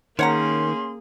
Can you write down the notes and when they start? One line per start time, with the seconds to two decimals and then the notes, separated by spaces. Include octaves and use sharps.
0.19 D#3 A#3 C#4 G#4 C#5 F#5 A#5 C6